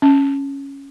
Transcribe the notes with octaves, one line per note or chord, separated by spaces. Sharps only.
C#4